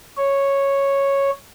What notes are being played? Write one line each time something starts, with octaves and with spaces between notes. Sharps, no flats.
C#5